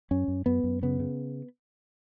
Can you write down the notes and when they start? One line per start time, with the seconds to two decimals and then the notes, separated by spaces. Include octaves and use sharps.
0.11 F#2 C#4
0.28 F#2
0.46 F#2 B3
0.64 F#2
0.83 C#3 B3
1.00 C#3